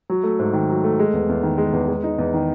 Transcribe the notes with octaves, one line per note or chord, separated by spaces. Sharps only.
F#3
A3
G#2
D#3
F#3
A3
G#3
E2
E2
D#3
G#3
E2
G#3
D#4
E2
D#3